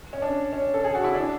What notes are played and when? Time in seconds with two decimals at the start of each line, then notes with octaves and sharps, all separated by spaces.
0.13 C#4
0.22 D4
0.53 C#4
0.74 A4
0.84 G#4
0.95 F#4
1.04 E4
1.15 D4